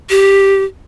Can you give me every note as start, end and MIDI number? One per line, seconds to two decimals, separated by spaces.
0.10 0.64 67